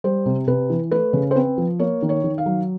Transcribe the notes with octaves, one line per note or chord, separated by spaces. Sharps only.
G3 C5
C3
C3 B4
E3
A3 B4
C#3
C5
C4 B4
F3
A#3 C#5
D#3
C#5
D#3
F5
F#3